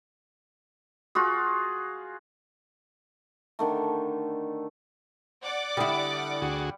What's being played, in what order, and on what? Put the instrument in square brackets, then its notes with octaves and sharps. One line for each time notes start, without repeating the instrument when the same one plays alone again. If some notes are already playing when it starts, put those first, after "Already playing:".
[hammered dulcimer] F4 F#4 G#4
D3 D#3 A3
[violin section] D5 F#5 D6
[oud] D3 E4 [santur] G3 B5 D#6
[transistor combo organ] D2 F#4 G#4